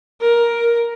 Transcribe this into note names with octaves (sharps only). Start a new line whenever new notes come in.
A#4